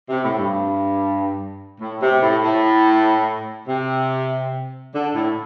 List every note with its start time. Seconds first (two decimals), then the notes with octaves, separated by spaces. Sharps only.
0.08 C3
0.23 A2
0.39 G2
1.80 A2
2.01 C3
2.21 A2
2.42 A2
3.68 C3
4.93 D3
5.13 A2